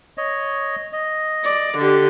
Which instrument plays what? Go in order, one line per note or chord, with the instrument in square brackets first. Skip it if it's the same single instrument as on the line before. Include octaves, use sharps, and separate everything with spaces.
[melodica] C#5 D#5
D#5
[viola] D5
D3 G4